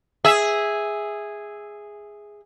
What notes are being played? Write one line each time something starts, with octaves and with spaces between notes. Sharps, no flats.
G#4 E5